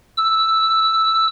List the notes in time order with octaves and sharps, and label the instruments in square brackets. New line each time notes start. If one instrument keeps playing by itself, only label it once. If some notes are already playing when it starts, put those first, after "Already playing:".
[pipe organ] E6